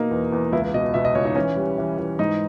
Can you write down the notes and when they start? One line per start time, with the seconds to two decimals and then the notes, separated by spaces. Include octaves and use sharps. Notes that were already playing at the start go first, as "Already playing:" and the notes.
Already playing: B2 A#3 D#4
0.11 E2
0.32 E2
0.52 C#2 E4
0.74 B2 D#5
0.94 B2 E5
1.05 D#5
1.15 C#2 C#5
1.25 D#4
1.36 E3 C#4
1.56 G3
1.78 E3
1.99 E3
2.19 G#2 D#4